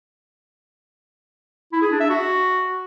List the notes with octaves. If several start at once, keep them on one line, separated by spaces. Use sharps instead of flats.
E4
G#4
D4
E5
F#4